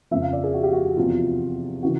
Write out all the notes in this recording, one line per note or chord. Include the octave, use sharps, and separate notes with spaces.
F2 C#3 F3 E5
F5
D5
G#4
F#4
G4
F#4
E2 C3 F3 F4
C#3 E3 F#4